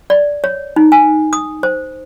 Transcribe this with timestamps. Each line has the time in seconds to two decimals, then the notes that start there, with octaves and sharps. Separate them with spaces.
0.10 D5
0.44 C#5
0.76 D#4
0.92 G#5
1.33 D#6
1.63 C5